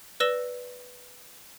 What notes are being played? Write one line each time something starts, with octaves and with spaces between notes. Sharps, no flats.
B4 D5 E6 A#6 E7 G7